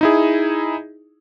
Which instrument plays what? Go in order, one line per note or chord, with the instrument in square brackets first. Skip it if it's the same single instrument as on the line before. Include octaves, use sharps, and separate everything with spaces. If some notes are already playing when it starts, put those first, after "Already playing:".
[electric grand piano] D#4 E4 G#4